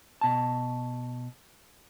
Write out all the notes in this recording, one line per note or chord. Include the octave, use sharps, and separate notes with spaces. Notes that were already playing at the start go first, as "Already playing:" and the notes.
B2 A5